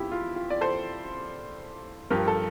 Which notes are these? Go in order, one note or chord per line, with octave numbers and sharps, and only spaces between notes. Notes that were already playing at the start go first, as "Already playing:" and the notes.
Already playing: E2 F3 E4 F4 G4
F4
F4
D5
A4 C5
G2 F3 G4 A#4
A4